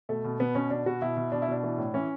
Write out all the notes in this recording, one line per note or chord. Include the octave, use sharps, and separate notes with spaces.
B2 A3
B2
B2 B3
B2 C#4
B2 D4
B2 F#4
B2 E4
B2
B2 D4
E4
B2 D4
E3
A2
E3 C#4